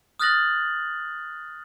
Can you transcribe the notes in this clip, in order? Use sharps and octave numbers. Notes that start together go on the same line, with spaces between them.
D#6 F6 F#6 A6 A#6 F#7